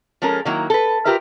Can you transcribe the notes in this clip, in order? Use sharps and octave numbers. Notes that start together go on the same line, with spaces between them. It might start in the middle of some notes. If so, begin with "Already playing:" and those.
F3 G#3 C#4 A4 A#4
D#3 F#3 A#3 E4
A4 B4
F4 G4 A#4 B4 E5